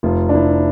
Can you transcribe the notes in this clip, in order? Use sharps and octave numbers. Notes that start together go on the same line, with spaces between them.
F1 F4
D4
F1 E4